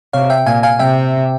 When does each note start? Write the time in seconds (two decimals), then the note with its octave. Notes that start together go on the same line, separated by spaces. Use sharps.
0.13 C3 C#5 F5
0.30 E5 G5
0.46 A#2 F5 G#5
0.63 F5 G#5
0.79 C3 E5 G5